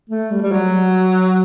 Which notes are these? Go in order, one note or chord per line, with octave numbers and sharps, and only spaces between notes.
A3
G3
G3
F#3